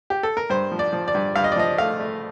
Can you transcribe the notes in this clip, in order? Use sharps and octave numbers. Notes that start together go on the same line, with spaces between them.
G4
A4
A#4
G2 C5
F3
D5
F3
D5
G2
G2 F5
D#5
D5
F3 D#5
A3 F5
A3